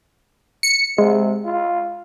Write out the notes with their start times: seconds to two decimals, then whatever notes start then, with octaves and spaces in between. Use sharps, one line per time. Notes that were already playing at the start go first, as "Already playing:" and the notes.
0.63 C#7
0.98 C3 G#3
1.45 F4